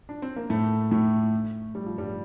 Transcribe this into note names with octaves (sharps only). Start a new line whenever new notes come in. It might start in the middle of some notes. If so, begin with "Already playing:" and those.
D4
C4
A#3
A2 A3
A2 A3
G3
F3
G2 G3